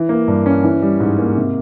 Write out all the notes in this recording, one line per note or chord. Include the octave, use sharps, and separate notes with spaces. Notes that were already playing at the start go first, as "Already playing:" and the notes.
Already playing: E3
A#3
G2
C#4
E3
G3
G#2
A#3
C3